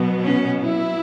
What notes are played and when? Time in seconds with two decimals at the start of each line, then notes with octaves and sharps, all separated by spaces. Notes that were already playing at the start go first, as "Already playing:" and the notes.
Already playing: B2 F#3 B3
0.22 C#4
0.62 E4